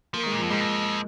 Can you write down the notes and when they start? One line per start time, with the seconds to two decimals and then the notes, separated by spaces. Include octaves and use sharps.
0.13 F3 A#3
0.23 D#3 G#3
0.32 A#2
0.38 F2 F3
0.50 G#2 G#3
0.61 F2